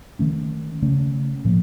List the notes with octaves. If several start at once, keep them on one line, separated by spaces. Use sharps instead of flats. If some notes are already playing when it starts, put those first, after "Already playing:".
D#3 A3 C#4
C#3 A3 C#4
A2 F3 A#3